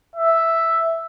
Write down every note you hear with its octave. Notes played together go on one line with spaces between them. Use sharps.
E5